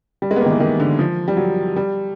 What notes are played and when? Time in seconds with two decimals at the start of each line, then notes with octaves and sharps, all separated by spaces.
0.22 G3
0.31 G#3
0.36 B3
0.41 D#3 A#3
0.51 E3
0.60 D#3
0.80 D3
0.99 F3
1.28 G3
1.37 F#3
1.76 G3